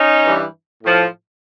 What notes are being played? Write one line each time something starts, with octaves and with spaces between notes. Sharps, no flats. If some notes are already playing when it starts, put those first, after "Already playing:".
Already playing: C#4 D#4
G2 E3 G3
A2 F3